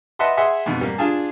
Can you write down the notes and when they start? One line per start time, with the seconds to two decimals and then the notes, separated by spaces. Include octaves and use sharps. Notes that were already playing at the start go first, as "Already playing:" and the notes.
0.19 B4 D#5 E5 F#5 A5 C6
0.37 G#4 E5 F#5 C6
0.66 F2 G#2 B2
0.81 G3 A#3
0.98 D4 F4 G#4 A5